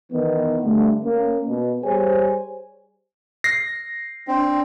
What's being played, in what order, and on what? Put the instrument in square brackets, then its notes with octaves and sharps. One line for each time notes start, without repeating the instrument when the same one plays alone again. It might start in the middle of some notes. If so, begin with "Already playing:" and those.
[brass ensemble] D#3 E3 B3
G2 D3 A3
A#3 C#4
B2
G3 G#4 C5 C#5 G#5
[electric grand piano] A#6 C7
[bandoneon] C4 [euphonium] D4